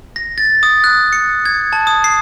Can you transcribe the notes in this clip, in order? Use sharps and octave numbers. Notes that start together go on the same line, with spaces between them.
A#6
A6
D#6
F#6
C#7
G#6
A5
D#6
C7